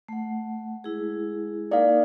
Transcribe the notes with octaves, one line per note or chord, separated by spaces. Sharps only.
A3 F#5
G#3 E4 G#4
A#3 D#4 A#4 D5 F5